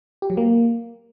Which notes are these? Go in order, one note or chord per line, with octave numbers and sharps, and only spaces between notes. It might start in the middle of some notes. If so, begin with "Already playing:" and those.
G4
F#3
A#3